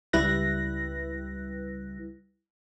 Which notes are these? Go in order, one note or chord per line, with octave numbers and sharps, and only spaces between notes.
C#2 G3 E4 B4 F#6 A#6